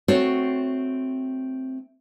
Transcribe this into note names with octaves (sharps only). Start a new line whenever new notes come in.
A3 C4 F#4 C5 C#5